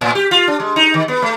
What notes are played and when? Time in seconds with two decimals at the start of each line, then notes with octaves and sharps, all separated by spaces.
0.01 A2
0.15 G4
0.31 F4
0.48 D4
0.60 G#3
0.76 D#4
0.94 D#3
1.08 B3
1.22 A3